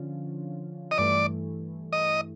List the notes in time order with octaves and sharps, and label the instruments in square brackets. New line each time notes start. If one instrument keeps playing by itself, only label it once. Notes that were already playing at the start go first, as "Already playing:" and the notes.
Already playing: [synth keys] D3 F3 C#4 F4
[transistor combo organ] D#5
[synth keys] G2 E3 A3 [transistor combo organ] D5
[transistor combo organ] D#5